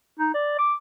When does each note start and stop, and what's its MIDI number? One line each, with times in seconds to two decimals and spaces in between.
0.19 0.31 63
0.34 0.55 74
0.59 0.74 86